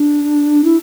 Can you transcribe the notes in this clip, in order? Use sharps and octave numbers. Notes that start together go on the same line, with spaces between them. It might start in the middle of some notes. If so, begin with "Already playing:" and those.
Already playing: D4
E4